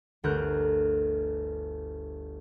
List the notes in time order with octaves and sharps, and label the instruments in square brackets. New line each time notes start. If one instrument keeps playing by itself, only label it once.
[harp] G1 D2 A#4 F#6 G6